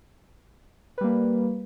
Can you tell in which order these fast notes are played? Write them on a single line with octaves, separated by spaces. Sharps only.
B4 G3 A#3